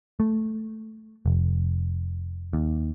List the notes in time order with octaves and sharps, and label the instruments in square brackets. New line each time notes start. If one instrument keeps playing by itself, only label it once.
[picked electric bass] A3
F1
D#2